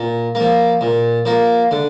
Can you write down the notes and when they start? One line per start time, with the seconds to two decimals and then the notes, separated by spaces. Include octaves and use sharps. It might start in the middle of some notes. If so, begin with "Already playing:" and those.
Already playing: A#2
0.35 A#3
0.40 F3
0.81 A#2
1.25 F3 A#3
1.71 D3